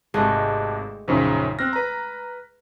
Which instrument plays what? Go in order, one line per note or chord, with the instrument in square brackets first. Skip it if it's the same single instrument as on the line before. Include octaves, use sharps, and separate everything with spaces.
[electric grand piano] G#1 C3 [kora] G#3 A3 [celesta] D#5 A5 F#6
[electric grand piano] A#1 F#2 C#3 [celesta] D#4 C5
[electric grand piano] C4 A#6 [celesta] F6 F#6
[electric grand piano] B4 A#5